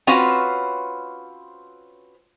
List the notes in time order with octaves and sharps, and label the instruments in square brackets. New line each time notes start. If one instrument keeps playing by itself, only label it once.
[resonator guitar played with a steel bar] C4 C#4 F4 F#4 B4 C5